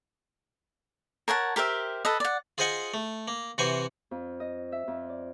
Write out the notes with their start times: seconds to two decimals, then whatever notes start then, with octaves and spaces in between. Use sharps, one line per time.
1.28 A#4 C#5 F#5 A5
1.56 G4 A#4 C5 E5
2.05 A4 B4 D#5
2.20 D5 F#5
2.58 F4 G#4 C5 D#5 F#5 G#5
2.94 A3
3.28 A#3
3.58 C3 E3 F#4 C5 G#5
4.11 F2
4.40 D#5
4.72 E5
4.88 F2
5.09 D5